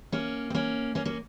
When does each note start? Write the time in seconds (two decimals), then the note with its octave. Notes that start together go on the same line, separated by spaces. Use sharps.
0.12 A#3 C#4
0.50 C4
0.55 A#3 C#4
0.95 A#3 C#4
1.05 A#3 C#4